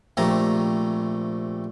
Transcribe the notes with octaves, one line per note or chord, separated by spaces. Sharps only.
A#1 C3 A3 A#5